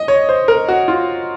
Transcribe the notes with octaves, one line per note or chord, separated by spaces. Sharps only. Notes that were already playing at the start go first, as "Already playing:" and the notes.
Already playing: D#5
C#5
C5
A#4
F#4
F4